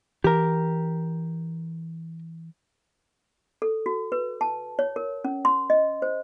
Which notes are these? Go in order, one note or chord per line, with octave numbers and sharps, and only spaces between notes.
E3 G4 A#4
A4
F#4
B4
A5
C#5
A#4
C#4
C6
D#5
C5